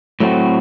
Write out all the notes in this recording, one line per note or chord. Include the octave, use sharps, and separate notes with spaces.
A2 F#3 A3 C4 F#4